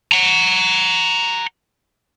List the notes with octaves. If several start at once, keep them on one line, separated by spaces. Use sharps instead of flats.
F#5 A#5